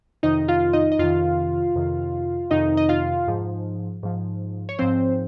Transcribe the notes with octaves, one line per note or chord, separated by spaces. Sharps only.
F2 C3 D#3 D#4 D#5
F4 F5
D#4 D#5
D#5
F2 C3 D#3 F4 F5
F2 C3 D#3
F2 C3 D#3 D#4 D#5
D#5
F4 F5
G#2 F3
G#2 F3
C#5
G#2 F3 C4 C5